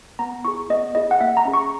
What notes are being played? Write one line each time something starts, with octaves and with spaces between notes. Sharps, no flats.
B3 A#5
E4 G#4 C#6
B3 D#5
E4 G#4 D#5
F#5
A#3 E5
A#5
C#4 G#4
C#6